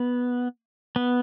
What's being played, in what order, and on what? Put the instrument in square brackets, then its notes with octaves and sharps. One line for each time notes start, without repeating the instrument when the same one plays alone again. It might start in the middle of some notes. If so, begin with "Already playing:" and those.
Already playing: [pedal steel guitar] B3
B3